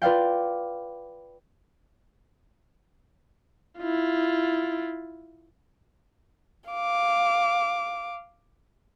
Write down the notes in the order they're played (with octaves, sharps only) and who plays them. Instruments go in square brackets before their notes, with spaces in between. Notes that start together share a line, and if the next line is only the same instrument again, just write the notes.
[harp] F4 B4 D5 F5 G5
[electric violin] E4 F4
[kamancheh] F5 D6